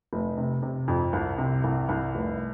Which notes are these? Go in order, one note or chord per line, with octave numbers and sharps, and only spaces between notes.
F1
C3
C3
F2
C2
C3
C2
C2
F1